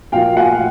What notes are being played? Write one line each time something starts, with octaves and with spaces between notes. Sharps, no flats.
A#2 F3 F5 G5
F#5 G#5